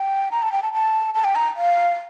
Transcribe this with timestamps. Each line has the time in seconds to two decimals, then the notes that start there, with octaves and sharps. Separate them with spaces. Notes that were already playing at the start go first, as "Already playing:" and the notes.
Already playing: G5
0.31 A#5
0.42 A5
0.52 G5
0.63 A5
0.73 A5
1.15 A5
1.24 G5
1.35 A#5
1.56 F5